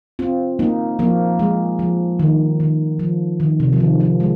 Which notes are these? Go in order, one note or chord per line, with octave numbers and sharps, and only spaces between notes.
C4 F4
A#3 D#4
F3 A#3
G#3
F3
D#3
D#3
F3
D#3
C3
F3
D#3
F3
G#3